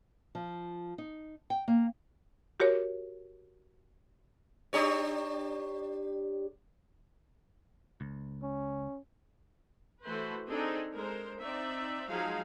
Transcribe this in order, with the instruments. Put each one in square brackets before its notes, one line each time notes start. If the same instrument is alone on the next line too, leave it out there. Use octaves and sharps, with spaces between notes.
[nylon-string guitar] F3
D#4
G5
A#3
[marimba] F#4 G4 A#4 C#5
[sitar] D4 G4 C#5
[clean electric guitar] C#2
[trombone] C#4
[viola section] E3 A3 F#4 A4 B4 C5
C4 D4 D#4 G#4 A4
G#3 A#4 C5
C4 D#4 D5 E5
F3 F#3 G#3 D#4 G#4 F5